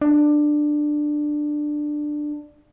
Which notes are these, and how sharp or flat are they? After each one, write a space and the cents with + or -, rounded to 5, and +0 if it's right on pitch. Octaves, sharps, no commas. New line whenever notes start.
D4 +15